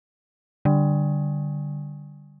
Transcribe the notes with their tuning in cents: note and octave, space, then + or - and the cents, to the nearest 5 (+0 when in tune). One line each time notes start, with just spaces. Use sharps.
D3 +0 G3 +0